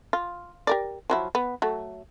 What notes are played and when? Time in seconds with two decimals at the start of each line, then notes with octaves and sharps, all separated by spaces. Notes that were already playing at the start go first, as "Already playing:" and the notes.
0.13 F4
0.67 G4 A#4 D5
1.10 F3 F#3 E4
1.35 B3
1.62 F#3 A3